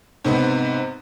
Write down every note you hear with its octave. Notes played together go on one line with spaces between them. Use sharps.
G#2 C3 B3